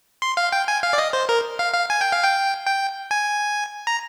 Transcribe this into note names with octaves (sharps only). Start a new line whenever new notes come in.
C6
F5
G5
G#5
F5
D5
D#5
C5
A#4
F5
F5
G#5
G5
F5
G5
G5
G#5
A#5